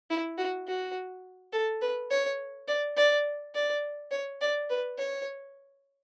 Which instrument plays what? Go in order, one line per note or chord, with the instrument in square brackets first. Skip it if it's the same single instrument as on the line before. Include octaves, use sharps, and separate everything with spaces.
[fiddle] E4
F#4
F#4
A4
B4
C#5
D5
D5
D5
C#5
D5
B4
C#5